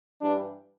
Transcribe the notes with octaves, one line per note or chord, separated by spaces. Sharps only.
G2 E3 G3 D4